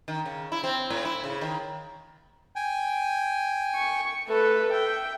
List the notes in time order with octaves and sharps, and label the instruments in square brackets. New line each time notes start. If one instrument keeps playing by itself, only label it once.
[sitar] D#3
C#3
E4
C4
A2
E4
C#3
D#3
[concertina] G5 G#5
[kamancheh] C#6
[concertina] A3 [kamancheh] A4 B4
[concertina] E5 [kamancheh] G5